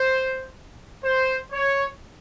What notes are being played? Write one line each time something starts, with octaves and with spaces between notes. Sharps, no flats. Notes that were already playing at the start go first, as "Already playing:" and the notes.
Already playing: C5
C5
C#5